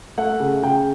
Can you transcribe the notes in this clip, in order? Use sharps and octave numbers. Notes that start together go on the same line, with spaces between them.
A3 F#5
C#3
C#3 G5